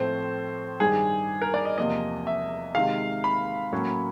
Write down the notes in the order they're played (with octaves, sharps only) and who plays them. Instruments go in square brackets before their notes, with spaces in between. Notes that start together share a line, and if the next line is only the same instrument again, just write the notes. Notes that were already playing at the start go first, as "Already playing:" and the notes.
Already playing: [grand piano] A2 F3 A3 C4 C5
G2 D#3 G3 G#4
A#4
D5
D#5
E2 C3 F3 A#3 D#5
E5
C3 D#3 G#3 F5
B5
A2 F#3 A#3 C#4